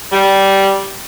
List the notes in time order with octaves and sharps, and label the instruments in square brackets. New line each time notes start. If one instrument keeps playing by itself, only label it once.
[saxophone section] G3